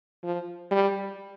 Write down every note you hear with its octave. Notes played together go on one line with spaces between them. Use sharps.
F3
G3